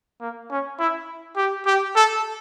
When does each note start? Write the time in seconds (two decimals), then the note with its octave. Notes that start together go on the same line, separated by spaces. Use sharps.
0.21 A#3
0.50 C#4
0.79 E4
1.37 G4
1.66 G4
1.96 A4